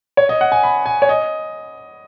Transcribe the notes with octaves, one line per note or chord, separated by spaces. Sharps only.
C#5
D#5
F#5
G#5
B5
G#5
C#5
D#5